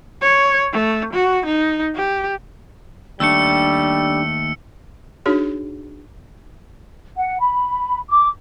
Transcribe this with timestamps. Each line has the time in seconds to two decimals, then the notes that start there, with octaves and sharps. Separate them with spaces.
0.22 C#5
0.73 A3
1.14 F#4
1.46 D#4
1.96 G4
3.20 D#2 G3 A3 D4 E6 C#7
5.26 D4 D#4 F#4 G#4 C#5
7.17 F#5
7.40 B5
8.09 D6